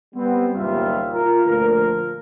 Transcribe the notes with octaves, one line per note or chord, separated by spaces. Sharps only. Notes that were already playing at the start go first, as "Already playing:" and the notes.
G3 B3 C4
F#1 D#2 A#2 G3 F4 E5
F4 A#4
D2 A#2 F3 A#4